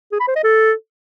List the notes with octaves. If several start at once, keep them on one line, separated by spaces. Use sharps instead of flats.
G#4
B5
C5
D#5
A4